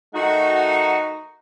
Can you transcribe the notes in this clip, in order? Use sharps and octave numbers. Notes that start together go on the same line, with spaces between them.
D#3 A3 D#4 F#4